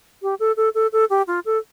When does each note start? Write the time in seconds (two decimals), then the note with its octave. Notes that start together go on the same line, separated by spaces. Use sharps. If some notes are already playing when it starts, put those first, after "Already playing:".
0.22 G4
0.40 A4
0.57 A4
0.75 A4
0.93 A4
1.10 G4
1.27 F4
1.45 A4